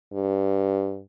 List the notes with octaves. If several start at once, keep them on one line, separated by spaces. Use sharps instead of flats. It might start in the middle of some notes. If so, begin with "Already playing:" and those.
G2